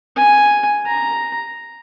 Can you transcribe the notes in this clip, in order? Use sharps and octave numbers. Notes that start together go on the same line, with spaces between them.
G#5
A#5